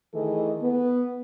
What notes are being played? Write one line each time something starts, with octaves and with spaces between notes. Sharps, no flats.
D#3 E3 A3 G#4 A4 D#5
B3